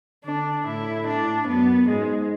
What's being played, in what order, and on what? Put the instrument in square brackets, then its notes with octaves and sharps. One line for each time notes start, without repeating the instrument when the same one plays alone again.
[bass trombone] D3 [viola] D4
[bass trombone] A2 [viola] E4
[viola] D4
[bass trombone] F#2 [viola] B3
[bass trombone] G#2 [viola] G#3